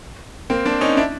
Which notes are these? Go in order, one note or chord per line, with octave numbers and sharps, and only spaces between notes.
A#3 C4
C4 D4
C#4 D#4
D4 E4